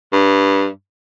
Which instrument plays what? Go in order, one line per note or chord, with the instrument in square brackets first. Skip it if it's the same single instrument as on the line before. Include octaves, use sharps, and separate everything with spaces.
[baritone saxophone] G2